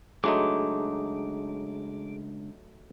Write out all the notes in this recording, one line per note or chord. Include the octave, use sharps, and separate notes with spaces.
C#2 F#3 A3 D4 D#4 G#4 C6 D6